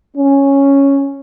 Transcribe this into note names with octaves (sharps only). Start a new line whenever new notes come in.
C#4